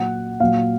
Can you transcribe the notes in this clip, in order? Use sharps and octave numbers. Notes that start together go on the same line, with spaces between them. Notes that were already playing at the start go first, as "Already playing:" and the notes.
Already playing: A#2 F#3 F#5
A#2 F#3 F5